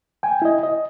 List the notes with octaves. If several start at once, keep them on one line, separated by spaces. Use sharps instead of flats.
G5 G#5
E4 D#5
D#5